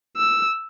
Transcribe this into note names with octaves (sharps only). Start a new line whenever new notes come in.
E6